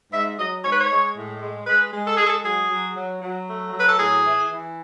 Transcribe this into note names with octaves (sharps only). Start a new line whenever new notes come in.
G#2 E5
F#3 D#5
G#2 C#5
B4
C#5
G#3
A2
G#3
G#3 B4
G#3
A4
G#3 G#4
A4
F#3 G#4
F#3
F#3
F#3
A3
F#3
B4
A4
A2 G#4
E3
E3